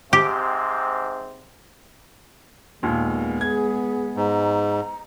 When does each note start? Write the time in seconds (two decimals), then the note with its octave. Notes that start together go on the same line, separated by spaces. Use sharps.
0.13 G#2 C3 C4 G4
2.83 D#2 A#2 G#3 B3
3.41 G#4 G#6
4.17 G#2 A#5